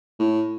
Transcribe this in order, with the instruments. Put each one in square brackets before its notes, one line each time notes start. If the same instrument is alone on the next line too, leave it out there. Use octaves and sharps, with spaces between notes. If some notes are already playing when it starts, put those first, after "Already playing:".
[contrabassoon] A2